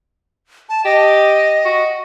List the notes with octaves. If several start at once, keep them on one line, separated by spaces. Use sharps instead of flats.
A5
G4 D#5
F#4